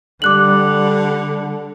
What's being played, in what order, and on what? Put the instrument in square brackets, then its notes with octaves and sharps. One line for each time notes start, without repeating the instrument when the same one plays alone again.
[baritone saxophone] D3 [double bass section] G3 [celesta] D6 F#6 F#7